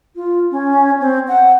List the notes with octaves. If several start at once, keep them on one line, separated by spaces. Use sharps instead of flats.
F4
C#4
C4
F#5